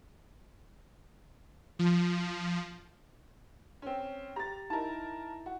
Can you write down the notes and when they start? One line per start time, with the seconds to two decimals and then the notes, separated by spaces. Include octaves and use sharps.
1.79 F3
3.82 C4 C#4
4.36 G4 A#5 A6
4.70 D#4 E4 A#4 A5
5.46 F#4